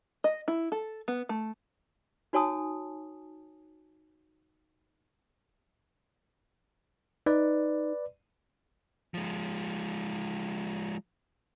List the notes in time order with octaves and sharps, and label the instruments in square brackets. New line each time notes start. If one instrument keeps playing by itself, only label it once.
[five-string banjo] D#5
E4
A4
B3
A3
[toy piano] D#4 F#4 C#5 G#5 A5 D#6
[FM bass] D#4 [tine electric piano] B4 D5
[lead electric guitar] F3 G#3